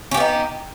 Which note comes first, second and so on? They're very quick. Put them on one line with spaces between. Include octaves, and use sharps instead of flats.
C#4 G4 B3 D#4